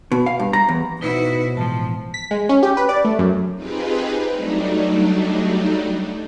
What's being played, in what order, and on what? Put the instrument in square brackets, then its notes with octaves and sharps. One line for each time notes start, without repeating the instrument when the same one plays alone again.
[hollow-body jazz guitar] B2
F5
G2
A#5
E2
[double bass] B2 [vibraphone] D#4 B4 C5 [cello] E4 F#4
[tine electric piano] A2 E3 G#3 [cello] F3 [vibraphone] A5
[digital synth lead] B6
G#3
C#4
G4
B4
D5
A3
F#2
[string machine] C4 D#4 F4 G4 G#4 B4
F#3 G3 A3 D4 D#4